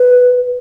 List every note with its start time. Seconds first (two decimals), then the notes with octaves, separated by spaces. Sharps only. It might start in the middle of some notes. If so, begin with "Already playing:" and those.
Already playing: B4